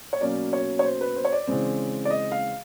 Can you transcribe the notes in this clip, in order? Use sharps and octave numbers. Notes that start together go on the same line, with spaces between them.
C#5
B2 F#3 A#3 C#4 D5
C#5
C#5
C5
B4
C5
C#5
D5
C#3 E3 G#3 C4
D5
D#5
F5